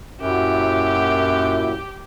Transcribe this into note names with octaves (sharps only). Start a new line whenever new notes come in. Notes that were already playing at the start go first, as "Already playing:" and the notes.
F#2 A#2 F#3 E4 G4